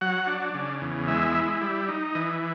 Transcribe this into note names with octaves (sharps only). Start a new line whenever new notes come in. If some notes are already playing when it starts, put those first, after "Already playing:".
F#3 F#5
D4
C#3
E2
G#3 E5
E4
G3
D#4
E3 D#5